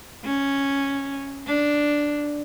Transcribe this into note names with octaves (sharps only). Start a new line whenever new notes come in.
C#4
D4